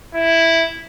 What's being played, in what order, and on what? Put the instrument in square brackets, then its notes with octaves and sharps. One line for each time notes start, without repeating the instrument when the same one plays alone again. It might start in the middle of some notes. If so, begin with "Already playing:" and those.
[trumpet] E4